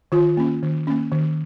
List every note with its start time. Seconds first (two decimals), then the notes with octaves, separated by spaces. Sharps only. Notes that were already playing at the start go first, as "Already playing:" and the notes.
0.12 D#3 F4
0.37 A#3 C#4
0.63 D#3
0.87 A#3 C#4
1.12 D#3